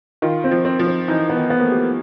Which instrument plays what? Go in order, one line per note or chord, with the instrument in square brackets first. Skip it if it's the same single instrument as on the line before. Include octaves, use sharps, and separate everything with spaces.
[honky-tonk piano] D#3 [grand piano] F4
[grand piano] C4
[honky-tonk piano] F3
[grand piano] C4
[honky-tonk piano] F3
[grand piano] C4
[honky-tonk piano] E3 [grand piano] D#4
[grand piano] B3
[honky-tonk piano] D#3
[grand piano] B3
[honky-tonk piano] A#3
A3
[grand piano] G4